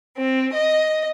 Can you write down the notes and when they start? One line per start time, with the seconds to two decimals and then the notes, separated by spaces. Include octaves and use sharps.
0.17 C4
0.54 D#5